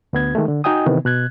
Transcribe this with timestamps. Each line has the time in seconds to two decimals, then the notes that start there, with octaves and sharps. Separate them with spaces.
0.13 D2 B3 G#6
0.35 D#3 G#3 A3
0.48 D3
0.64 D#4 F#4 D#5 G5 G#5 D#6
0.86 C3 D#3 E3 B3
1.05 B2 F#6 G#6